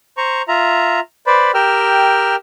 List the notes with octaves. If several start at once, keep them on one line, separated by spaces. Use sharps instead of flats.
C5 A#5 C#6
F4 E5 A#5
B4 C5 D5 B5
G4 A#4 G5 E6 F6